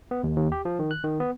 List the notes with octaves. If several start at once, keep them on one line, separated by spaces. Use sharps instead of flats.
B3
D#2
D#2
G4
F3
D#3
F#6
D#3
B3